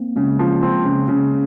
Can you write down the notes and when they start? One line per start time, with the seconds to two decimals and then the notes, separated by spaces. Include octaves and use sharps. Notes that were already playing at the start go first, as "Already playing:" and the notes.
Already playing: A#3 C4
0.16 C#3 G#3
0.39 F3
0.63 C4
0.84 C#3
1.08 C#3